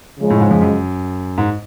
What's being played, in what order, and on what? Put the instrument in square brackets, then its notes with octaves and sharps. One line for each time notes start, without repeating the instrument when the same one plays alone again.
[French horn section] C#3 F3 G#3
[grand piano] A2
G#2
F2
F#2
G#2